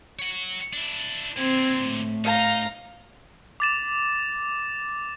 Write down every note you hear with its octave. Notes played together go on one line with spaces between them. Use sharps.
C#5 F#5
D4 E4
A#2 D3 C4 G#6
A2
D#4 F5 A#5
D6 A6 E7